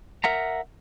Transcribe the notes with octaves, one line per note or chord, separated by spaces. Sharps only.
A#4 E5 F#5 A#5